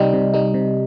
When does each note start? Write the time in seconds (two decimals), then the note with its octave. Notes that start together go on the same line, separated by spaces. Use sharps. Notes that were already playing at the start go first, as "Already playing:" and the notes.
Already playing: C3 G3 D#4
0.13 C3
0.34 G3 D#4
0.54 C3